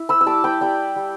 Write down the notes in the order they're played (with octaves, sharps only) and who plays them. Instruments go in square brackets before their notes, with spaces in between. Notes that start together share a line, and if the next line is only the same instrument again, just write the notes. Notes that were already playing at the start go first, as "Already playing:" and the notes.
Already playing: [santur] E4
B5 E6
E6
G3 A5 D6
G5 B5
G3 D5 G5
G3